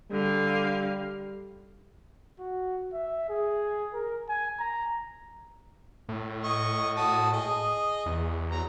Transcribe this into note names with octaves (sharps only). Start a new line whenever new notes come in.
D3 G3 F5
F#4
E5
G#4
A#4
G#5
A#5
A2
D#5 C#6
F#4 A5 D#6
G#4 D#5
E2
F#3 A#5